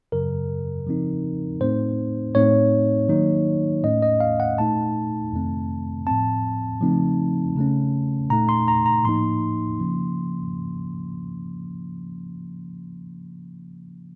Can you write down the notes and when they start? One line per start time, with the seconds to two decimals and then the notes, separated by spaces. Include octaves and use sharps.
0.12 F#2 C#3 F#3 A#4
0.86 C#3 F3 C4 D#4
1.60 A2 A3 C4 D#4 C5
2.35 A2 A3 C4 D#4 C#5
3.09 D#3 F#3 A#3 D#4
3.84 A2 A3 C#4 D#5
4.02 D#5
4.20 F5
4.40 F#5
4.58 A#2 A3 D#4 A5
5.32 F2 C3 D#3 A3 C4
6.07 A2 F3 C4 A5
6.81 C#3 F3 A3 C4 D#4
7.56 C#3 A3 C#4
8.30 A#2 A3 D#4 A#5
8.49 C6
8.68 A#5
8.86 A#5
9.04 A2 F3 A#3 D#4 C6
9.79 C#3 F3 A#3 C#4